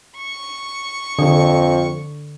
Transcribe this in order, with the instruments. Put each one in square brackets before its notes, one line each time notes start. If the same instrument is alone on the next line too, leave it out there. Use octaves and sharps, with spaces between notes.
[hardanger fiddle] C#6
[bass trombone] F2 [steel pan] D3